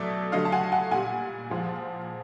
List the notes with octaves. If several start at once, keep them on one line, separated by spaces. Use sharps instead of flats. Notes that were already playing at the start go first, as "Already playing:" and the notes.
Already playing: B2 F#3 A3 D5 E5
D3 F#3 A3 D#5 F5
A5
F#5 G#5
F#5 G#5
A#2 G3 F#5 G#5
A#2 F3 G#3